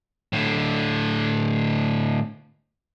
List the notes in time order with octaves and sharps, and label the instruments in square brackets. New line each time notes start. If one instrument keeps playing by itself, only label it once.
[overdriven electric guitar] A2 D3